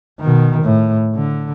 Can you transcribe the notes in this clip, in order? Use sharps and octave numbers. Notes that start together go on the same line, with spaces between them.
B2 D#3
A2
D3